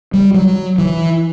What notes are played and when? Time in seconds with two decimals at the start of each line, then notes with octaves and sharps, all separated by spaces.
0.14 G3
0.34 F#3
0.78 E3